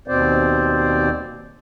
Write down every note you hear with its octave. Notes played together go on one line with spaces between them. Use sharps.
D#2 B2 C4 C5 D5